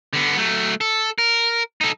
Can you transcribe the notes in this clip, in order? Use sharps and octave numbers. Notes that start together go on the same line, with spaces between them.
D3 B3
F#3 A3
A4
A#4
D#4 A4